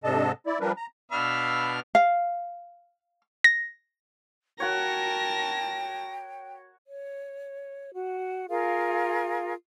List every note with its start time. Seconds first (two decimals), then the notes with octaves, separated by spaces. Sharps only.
0.04 G#2 C3 D4 A4 D#5 A5
0.46 E4 D5
0.61 F3 G3 D4 A#4 B4
0.77 A#5
1.12 B2 D4 F5 B5 E6 F6
1.95 F5
3.44 A#6
4.60 F#4 A#4 C#5 G5 A5 A#6
6.89 C#5
7.94 F#4
8.49 F4 G#4 A#4 F5